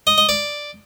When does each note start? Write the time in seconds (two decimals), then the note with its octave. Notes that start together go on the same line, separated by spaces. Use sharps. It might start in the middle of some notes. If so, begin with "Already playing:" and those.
0.07 D#5
0.18 D#5
0.29 D5